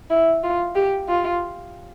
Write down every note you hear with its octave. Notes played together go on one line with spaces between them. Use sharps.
E4
F4
G4
F4